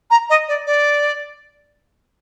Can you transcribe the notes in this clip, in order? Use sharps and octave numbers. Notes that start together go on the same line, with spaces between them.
A#5
D#5
D5
D5